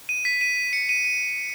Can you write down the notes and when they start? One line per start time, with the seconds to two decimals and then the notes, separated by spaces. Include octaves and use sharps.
0.09 D#7
0.25 B6
0.41 D#7
0.57 D#7
0.73 C#7
0.89 D#7
1.05 D#7